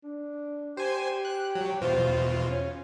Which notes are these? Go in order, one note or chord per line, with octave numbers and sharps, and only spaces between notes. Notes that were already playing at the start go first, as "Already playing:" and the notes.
D4
G4 C5 G#5
F#6
F#3
E2 B2 F4 C5
C#4